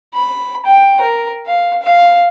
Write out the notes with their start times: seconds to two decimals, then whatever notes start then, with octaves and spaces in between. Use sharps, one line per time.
0.14 B5
0.66 G5
1.00 A#4
1.46 F5
1.82 F5